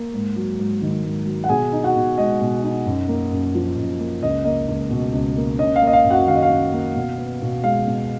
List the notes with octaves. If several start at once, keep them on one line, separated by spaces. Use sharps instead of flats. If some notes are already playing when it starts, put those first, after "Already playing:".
Already playing: A#3
G#2
F#3
G#2
D#3
G#2
F#3
F#5
B2 G#4 G#5
D#4
F#4 F#5
B2
G#3 D#5
B2
D#4
F#2
A#3
F#2
F3
F#2
A#3
C#2 D#5
A#3 D#5
C#2
B2
C#2
A#3
C#4 D#5
F5
A#3
D#5
F5
F#2
F#4 F#5
D#3 F5
D#5
F5
C#4
A#3
B2
B3
B2
G#3 F5
B2